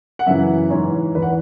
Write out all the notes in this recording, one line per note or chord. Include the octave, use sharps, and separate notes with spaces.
F#5
F#2 C#3 E3 E5
G#2 E3 C#5
E2 E3 B4
F#5